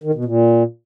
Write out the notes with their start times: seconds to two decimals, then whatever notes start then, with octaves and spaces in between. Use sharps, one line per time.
0.04 D#3
0.14 B2
0.25 A#2